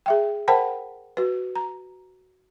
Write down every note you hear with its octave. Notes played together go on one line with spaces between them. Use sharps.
G#4 E5 G5
A#4 C5 F#5 G5 A5 B5
F#4 B4
A#5